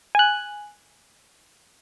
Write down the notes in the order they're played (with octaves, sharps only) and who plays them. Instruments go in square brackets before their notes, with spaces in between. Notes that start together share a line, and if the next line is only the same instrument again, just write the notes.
[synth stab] G#5 F#6